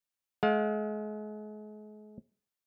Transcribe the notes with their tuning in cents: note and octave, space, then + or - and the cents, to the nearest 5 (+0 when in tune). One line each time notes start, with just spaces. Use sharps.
G#3 +40 F5 +40